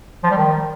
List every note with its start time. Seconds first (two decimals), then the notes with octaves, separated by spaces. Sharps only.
0.24 F3
0.31 G3
0.38 D#3